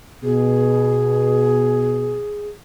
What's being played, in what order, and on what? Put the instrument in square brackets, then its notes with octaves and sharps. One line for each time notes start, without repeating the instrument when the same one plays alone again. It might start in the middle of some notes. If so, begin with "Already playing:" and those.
[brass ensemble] B2 [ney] G#4